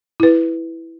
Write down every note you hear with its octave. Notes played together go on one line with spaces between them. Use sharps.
E4 B4